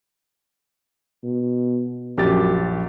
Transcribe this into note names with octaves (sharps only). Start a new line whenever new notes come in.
B2
A#1 F#2 G4 A6